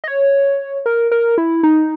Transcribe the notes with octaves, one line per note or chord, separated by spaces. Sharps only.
D#5
C#5
A#4
A#4
E4
D#4